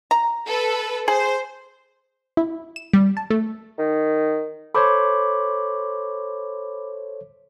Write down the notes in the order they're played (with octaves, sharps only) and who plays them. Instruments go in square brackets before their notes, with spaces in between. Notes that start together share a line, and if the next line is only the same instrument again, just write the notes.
[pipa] A#5
[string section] A4 B4
[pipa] G#4 [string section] C5
[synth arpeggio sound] E4
E7
G3
A5
A3
[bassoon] D#3
[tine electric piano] A4 C5 C#5 [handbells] B5 D6